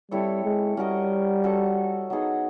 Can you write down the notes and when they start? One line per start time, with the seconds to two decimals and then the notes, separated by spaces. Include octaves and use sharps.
0.11 G3 C4 E4 A4 C#5
0.44 G#3
0.77 G3 C#4 F#4 A#4 D#5
1.44 C#4 F#4 A4
2.10 F#3 B3 D#4 G#4